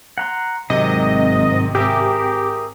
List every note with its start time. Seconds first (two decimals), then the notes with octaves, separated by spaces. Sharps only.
0.18 F#5 A#5 C6
0.70 G#1 C3 D#3 F#3 G#3 C4 D#5
1.75 G4 G#4 A#4 E5